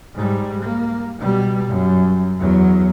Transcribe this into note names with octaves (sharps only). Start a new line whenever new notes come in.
G#2 G3
A#3
B2 G3
F#2
E2 F#3